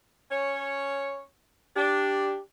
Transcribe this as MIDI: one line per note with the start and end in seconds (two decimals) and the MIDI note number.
0.31 1.22 61
0.31 1.22 73
1.76 2.33 62
1.76 2.39 67